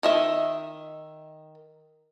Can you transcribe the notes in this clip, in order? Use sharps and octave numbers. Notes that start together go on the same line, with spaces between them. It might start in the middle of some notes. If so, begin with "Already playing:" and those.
D#3 D#5 E5